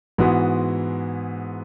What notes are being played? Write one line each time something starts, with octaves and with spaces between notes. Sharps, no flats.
G#2 E3 G#3 B3 F#4